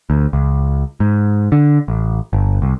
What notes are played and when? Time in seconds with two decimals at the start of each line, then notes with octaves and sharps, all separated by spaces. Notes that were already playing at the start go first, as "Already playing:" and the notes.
0.10 D2
0.33 C#2
1.00 G#2
1.52 D3
1.88 A1
2.33 G1
2.62 C2